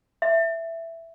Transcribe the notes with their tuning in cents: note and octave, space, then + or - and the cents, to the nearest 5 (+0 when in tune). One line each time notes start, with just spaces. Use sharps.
E5 +5